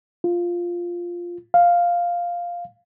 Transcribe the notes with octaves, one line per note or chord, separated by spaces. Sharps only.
F4
F5